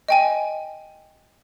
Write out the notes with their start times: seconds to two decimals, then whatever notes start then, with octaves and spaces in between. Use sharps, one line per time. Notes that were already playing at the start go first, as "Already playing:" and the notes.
0.08 D#5 G5 G#5